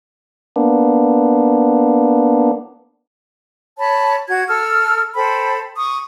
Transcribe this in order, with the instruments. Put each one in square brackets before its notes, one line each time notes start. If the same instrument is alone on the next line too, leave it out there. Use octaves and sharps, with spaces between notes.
[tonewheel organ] A#3 B3 D4
[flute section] C#5 A5 B5
F#4 G#6
A4 E6 F6
A4 C5 G5 B5
C#6 D#6